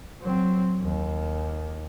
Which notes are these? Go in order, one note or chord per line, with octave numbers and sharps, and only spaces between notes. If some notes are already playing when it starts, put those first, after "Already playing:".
F#3 C4
D#2